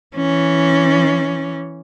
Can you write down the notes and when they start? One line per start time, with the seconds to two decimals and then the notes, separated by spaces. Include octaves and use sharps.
0.16 E3 C#4